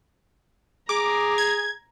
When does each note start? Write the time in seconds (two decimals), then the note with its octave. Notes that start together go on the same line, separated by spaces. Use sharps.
0.89 G#4 A#5 D6
1.38 G#6